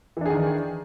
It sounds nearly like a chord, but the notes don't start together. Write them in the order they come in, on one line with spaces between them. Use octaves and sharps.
E3 D4 G#4 D#3